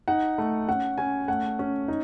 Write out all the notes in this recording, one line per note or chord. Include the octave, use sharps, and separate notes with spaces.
D#4 F#5
A3
C#4 F#5
C#4 G#5
A3 F#5
C#4
D#4